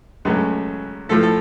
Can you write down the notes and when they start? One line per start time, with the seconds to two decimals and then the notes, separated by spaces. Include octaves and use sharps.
0.25 C#2 C#3 F#3 A3
1.09 A2 F3 A3 A4
1.23 A4